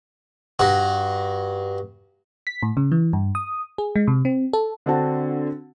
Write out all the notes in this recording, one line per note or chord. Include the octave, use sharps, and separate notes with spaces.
G2 F#4
B6
A2
C#3
E3
G2
D#6
G#4
G#3
C3
C4
A4
D3 C4 D4 F#4 A5